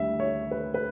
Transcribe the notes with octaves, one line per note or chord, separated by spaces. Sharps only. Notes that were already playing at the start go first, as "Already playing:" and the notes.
Already playing: D2 D3 G3 E5
C#5
B4
B4